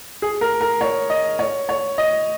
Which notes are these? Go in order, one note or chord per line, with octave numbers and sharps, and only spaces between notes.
G#4
A#4
A#4
C#5
D#5
C#5
C#5
D#5